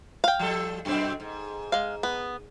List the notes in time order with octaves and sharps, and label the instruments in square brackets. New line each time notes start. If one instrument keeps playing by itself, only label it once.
[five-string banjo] F5 G5
[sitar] F3 G3 A4
F#2 B2 C4
G#2
[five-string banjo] G#3 F5
B3